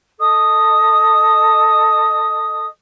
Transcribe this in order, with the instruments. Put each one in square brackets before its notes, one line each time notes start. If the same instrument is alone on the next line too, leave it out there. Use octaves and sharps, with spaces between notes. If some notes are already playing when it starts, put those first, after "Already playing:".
[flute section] A4 D#5 D#6